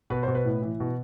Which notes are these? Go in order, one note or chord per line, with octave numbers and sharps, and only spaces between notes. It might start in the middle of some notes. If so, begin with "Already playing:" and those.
B2 B4
B2 C5
B4
A2
E3
B2